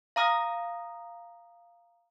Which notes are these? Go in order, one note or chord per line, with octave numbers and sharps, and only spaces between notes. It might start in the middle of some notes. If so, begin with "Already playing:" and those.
F5 A#5 D#6 F6 A#6